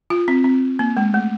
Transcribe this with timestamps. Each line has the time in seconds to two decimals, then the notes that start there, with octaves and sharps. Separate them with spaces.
0.10 F4
0.28 C4
0.44 C4
0.79 A#3
0.97 G#3
1.14 A3